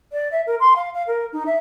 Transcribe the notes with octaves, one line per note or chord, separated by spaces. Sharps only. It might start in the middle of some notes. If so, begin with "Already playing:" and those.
D5
E5
A#4
C6
F5
F5
A#4
D#4
E5